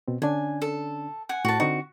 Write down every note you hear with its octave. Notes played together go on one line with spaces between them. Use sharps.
B2 C4
D3 C#4 D4 G#5
A4
F#5 G#5
A2 F#4 A5
D3 C4 D#4 F#4